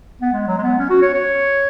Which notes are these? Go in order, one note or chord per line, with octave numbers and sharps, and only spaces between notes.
B3
G#3
F#3
G#3
B3
C#4
F#4
C#5
C#5